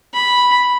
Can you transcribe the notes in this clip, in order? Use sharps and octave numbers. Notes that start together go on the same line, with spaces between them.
B5